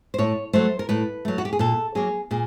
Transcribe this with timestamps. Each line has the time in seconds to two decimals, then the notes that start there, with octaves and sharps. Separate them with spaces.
0.14 C5
0.18 A2 C#5
0.53 F#3 A3 C5
0.79 A#4
0.89 A2 B4
1.25 F#3 A3
1.38 F#4
1.45 G4
1.53 G#4
1.59 A#2 A4
1.95 F#3 A#3 G#4
2.31 A#2 G#4